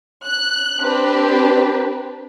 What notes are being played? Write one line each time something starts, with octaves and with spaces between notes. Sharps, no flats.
F#6
C4 D4 G4 B4